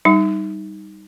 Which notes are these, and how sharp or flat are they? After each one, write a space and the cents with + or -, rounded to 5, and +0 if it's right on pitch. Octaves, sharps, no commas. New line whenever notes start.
G3 +0 D#4 +0